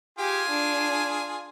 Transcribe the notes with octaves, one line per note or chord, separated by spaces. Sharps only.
F4 G4 G#4 G#5
D4